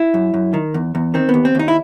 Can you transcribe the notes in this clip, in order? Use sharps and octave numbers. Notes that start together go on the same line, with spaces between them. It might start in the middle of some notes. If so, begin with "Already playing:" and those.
Already playing: E4
F#2
F#2
D#3
E2
E2
D#3 C4
B3
D#2
C4
D#2 D#4
E4